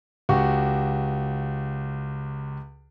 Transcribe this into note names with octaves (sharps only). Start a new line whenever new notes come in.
C#2 F#4 G4 C#6